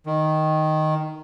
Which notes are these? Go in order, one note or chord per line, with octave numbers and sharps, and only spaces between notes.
D#3